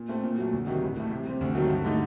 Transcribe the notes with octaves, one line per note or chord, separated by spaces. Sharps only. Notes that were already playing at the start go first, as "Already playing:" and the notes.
Already playing: A#2
A3 C4
A#2
F#3 A3
D2
C3 D#3 F#3
A1
A2 A3
C3
G3 C4
D2
C3 D#3 F#3 A3
G2
D3 A3 D#4